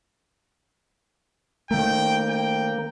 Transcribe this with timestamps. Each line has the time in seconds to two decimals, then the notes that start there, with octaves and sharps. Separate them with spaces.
1.71 D#3 A3 A#3 A#4 G5
2.29 G5